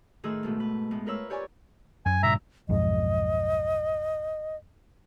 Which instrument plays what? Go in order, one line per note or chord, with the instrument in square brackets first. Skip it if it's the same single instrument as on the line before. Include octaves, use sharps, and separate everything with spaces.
[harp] A2 D#3 G#4 C6 E6
G#2 B2 A3
B4
A2 G#3 B3
F4 A#4 B4 C#5 E6
G4 C#5 D5 G#5 C#6
[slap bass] F#2 [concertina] G#5
[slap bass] G2 A#2 C#3 [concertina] E5 A#5
[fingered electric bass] B1 F2 G#2 [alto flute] D#5